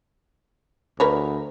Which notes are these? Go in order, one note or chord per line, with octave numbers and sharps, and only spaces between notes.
D2 A#4 B4 C#5